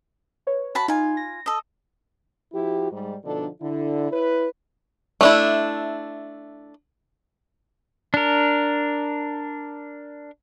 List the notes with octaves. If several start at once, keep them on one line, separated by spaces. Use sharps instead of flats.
B4 C#5
F#4 A5 B5
D#4 F4 G#5
A#6
A4 D#5
F3 E4 F#4 G4
G#2 G3 G#3
B2 D3 F3 D4 D#4 A4
D3 E4
E4 B4 C#5
A3 D4 E4
D4 A#4